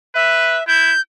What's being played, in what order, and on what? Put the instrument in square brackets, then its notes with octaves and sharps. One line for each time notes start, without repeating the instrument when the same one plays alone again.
[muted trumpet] B4 [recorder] E5
[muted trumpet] E4 [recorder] G6